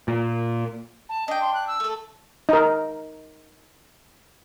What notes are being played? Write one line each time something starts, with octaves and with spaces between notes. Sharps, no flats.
A#2
A5
D4 D#5 G5
C6
F#6
E6
A3 A4
D#4 A#4